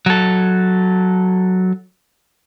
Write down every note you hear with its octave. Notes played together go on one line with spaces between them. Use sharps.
F#3 A4